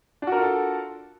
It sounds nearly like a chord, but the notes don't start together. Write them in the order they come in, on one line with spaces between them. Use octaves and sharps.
D4 F#4 A#4 F4 A4